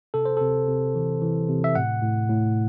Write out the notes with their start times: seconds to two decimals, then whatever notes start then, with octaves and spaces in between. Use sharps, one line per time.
0.14 C3 A4
0.25 C5
0.37 C3 A4
0.68 C3
0.95 E3
1.22 E3
1.49 C3
1.64 E5
1.75 A2 F#5
2.02 A2
2.29 A2